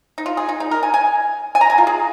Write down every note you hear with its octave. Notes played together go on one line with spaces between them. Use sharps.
D#4
F4
G#4
D#4
D#4
A#4
G#5
G#5
G#5
A#5
G#5
F4
G#4